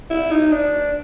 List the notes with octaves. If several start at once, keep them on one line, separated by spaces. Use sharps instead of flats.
E4
D#4
D4